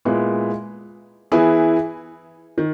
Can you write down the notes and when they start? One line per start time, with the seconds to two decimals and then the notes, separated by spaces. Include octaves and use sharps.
0.05 A#2 G#3 B3 E4
1.32 E3 B3 E4 G#4
2.58 D#3